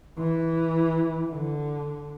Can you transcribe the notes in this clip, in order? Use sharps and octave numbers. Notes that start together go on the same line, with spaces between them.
E3
D3